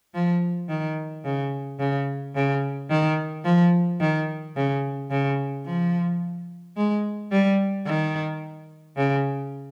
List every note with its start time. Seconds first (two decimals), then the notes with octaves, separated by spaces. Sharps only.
0.14 F3
0.69 D#3
1.25 C#3
1.79 C#3
2.35 C#3
2.90 D#3
3.45 F3
4.00 D#3
4.56 C#3
5.11 C#3
5.66 F3
6.77 G#3
7.32 G3
7.86 D#3
8.97 C#3